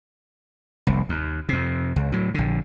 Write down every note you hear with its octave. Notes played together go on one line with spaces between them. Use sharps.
F1 C2
D#2
F2 C3
C#2
A2 F#3
A#1 D3